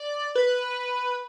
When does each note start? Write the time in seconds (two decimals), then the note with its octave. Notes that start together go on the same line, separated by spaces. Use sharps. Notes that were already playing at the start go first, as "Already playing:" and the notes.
Already playing: D5
0.35 B4